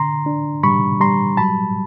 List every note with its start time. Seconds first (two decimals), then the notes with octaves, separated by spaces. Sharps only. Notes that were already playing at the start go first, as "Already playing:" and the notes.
Already playing: D3 A#5 C6
0.26 D4
0.63 G3 B5 C#6
1.00 G3 A#5 C6
1.37 F#3 A5 B5